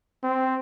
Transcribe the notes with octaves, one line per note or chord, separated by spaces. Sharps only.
C4